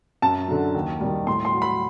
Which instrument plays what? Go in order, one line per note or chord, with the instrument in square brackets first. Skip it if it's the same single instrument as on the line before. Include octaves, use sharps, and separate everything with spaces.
[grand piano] F#2 A5
D3 F#3
D#2
D#3 G3
A2 C6
C6
F#3
B5